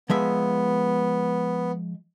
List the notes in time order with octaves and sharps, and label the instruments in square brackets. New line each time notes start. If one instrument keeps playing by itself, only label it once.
[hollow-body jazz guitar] F3 G#3 E5 [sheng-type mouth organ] B3